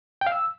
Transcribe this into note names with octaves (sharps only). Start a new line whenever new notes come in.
G5
F5
E6